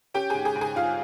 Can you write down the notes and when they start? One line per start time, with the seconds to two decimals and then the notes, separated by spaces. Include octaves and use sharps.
0.14 C#4 G4 G5
0.30 G#2 G#4 G#5
0.45 G#4 G#5
0.55 G#2
0.61 G#4 G#5
0.76 G#2 F4 F5